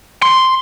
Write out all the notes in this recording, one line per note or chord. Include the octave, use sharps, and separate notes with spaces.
C6